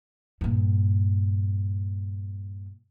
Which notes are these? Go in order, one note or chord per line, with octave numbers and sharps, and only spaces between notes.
G2 A#2